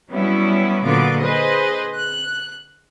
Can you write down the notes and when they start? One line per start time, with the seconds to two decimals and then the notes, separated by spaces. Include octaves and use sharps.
0.11 F#3 G3 B3 C#4 E4
0.84 A#2 D3 F#3 B3 F4 D6
1.20 G#4 B4 C5 D#5
1.96 F#6